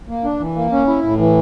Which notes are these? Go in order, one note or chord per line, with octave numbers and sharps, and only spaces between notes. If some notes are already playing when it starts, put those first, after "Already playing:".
A#3
D4
E3
A#3
C#4
E4
A2
E3